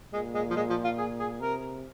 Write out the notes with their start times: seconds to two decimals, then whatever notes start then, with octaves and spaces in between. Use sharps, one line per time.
0.13 A#2 G#3
0.34 G#3
0.50 F3
0.56 G#3
0.69 F3
0.84 F4
0.98 G#4
1.19 G#4
1.40 C3 A#4